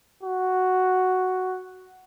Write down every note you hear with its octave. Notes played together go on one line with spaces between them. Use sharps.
F#4